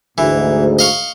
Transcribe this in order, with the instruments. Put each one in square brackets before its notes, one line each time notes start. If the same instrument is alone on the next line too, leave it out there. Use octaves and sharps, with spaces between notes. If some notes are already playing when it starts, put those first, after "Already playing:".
[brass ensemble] D2 G#2 [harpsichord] E3
[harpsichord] D#5 F5 C#6